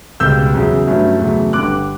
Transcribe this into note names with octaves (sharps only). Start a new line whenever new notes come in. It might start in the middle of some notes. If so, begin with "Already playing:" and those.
C#2 B2 G3 E6 G6
E2 C#3 F#3
G2 F#3 A3 C#4 E4
E2 C#3 F#3 A3
G1 G2 D3 G3 D6 F#6